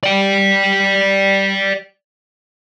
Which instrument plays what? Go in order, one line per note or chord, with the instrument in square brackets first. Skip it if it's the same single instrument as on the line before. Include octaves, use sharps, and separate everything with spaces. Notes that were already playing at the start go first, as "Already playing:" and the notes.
[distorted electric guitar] D5 G5